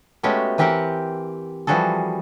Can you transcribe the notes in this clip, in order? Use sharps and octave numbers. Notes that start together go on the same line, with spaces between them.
G#3 A3 B3 C#4 F#4 G4
E3 C4 G4 A#4 C5 F#5
E3 F3 G3 F#4 G#4 A4